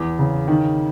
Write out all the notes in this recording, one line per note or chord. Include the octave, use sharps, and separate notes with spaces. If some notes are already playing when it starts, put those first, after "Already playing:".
Already playing: E2
C#3
D#3